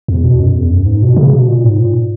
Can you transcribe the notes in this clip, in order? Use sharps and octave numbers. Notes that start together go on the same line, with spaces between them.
E2
B2
F#2
E2
F#2
G#2
B2
C#3
B2
A#2
G#2
A#2